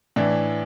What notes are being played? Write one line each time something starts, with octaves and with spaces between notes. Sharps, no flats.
A2 E3 D4